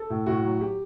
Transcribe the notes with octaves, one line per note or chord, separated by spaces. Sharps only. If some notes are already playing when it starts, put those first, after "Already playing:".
Already playing: A4
A2
A2 F#4
F#3
F#3 G4